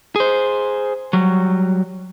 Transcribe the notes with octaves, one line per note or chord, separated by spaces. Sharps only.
G#4 C5
F#3 G3